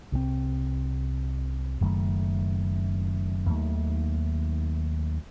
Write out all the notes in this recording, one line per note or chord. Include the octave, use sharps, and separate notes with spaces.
C2 C3 F#3 C4
F#1 F#2 D#3 A3
D#2 D#3 F#3 A3